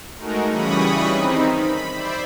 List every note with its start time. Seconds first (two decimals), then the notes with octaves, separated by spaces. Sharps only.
0.18 G#3 A3 D#4 F#4 A#4
0.48 C#3 E3 G3 B5 C#6 D#6
1.10 D#3 C4 D#4
1.55 B5
1.92 C5 D5 E5